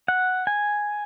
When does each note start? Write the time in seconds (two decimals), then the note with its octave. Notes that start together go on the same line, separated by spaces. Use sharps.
0.08 F#5
0.47 G#5